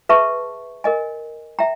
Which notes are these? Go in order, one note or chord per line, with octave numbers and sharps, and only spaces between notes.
G#4 B4 E5 A5 C#6
A#4 D#5 G#5
E5 G5 A#5